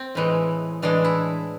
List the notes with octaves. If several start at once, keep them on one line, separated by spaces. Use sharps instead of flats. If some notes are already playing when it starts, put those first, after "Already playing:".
Already playing: C4
A2 E3 G#3
A2 E3 G#3 D4
E4